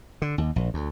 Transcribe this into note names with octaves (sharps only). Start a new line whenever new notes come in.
D3
D#2
A#1
D2